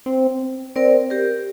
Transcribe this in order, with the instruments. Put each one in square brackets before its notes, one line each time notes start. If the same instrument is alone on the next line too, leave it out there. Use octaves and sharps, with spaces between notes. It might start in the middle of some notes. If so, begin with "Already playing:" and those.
[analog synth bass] C4
[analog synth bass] C4 [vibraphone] A#4 D5
[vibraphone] G4 A#4